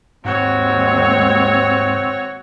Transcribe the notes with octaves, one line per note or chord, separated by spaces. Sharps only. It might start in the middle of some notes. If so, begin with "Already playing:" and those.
D#2 G#2 G#3 C4 F#4 C#5